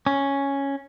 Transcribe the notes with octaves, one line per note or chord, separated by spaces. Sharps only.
C#4